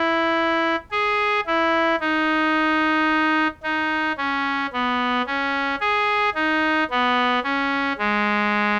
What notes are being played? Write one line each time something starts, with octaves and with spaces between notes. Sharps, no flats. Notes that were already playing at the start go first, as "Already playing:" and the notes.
Already playing: E4
G#4
E4
D#4
D#4
C#4
B3
C#4
G#4
D#4
B3
C#4
G#3